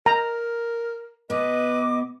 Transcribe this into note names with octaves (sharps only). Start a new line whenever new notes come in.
A#4 A#5
B2 B3 B4 D#5 D6